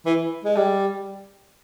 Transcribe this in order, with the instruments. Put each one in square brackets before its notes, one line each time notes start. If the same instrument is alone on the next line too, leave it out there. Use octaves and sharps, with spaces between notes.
[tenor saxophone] E3
G#3
G3